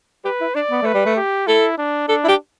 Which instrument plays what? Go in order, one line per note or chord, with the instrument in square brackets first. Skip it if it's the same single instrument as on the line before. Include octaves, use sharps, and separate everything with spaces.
[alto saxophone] G4 [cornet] B4
[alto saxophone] E4
[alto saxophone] D4 [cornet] D5
[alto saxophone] B3
[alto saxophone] A3 [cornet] B4
[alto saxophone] G3
A3
[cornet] G4
[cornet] E4 [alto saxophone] A4
[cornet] D4
[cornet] D4 [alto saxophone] A4
[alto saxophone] E4
G4